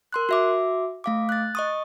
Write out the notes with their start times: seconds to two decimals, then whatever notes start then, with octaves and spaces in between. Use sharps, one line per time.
0.13 A#4 C6 F#6
0.29 F#4 E5 D6
1.04 A3 F5 D6
1.29 F#6 A6
1.55 D#5 C#6 D#6